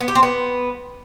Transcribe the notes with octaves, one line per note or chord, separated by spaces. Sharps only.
B3
G4
C4
B3